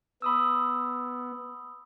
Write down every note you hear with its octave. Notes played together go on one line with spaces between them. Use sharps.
B3 B5 D#6 E6